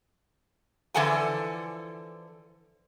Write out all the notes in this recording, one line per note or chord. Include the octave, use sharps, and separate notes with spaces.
D3 E3 F3 A4 F#5 G#5